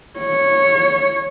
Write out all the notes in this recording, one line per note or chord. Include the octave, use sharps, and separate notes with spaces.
C#5